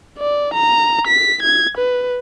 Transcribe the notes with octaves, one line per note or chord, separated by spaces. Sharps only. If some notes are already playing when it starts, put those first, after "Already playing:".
D5
A#5
B6
G#6
B4